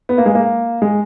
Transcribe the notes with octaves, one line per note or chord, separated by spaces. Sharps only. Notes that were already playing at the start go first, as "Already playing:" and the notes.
B3
A#3
G#3
A#3
G#3